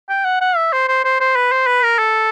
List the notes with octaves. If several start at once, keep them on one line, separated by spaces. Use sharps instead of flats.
G5
F#5
F#5
E5
C5
C5
C5
C5
B4
C5
B4
A#4
A4